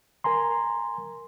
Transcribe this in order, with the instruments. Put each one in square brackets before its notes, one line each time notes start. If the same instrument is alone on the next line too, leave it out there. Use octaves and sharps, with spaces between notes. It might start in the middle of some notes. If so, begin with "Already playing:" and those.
[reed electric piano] A#4 G#5 A#5 C6